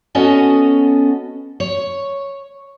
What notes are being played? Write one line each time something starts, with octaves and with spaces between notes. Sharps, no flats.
B3 C#4 F#4 A4 D#5
C#5